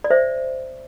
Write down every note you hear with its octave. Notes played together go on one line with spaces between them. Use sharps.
D5
C5 E5